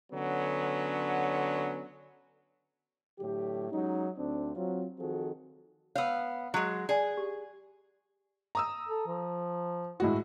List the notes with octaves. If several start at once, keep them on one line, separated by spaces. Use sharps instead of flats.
D3 F#3 B3 C#4
A2 D3 F#3 G4
F#3 G#3 C#4 D#4
D2 C4 D4
F#3 C4 F4
D#3 F3 C4 F#4 G#4 A4
B3 C#5 F5 E6
F#3 G#3
G#4 D5 G#5
G4
A#5 D#6 E6
A4
F3
A2 G#3 E4 F#4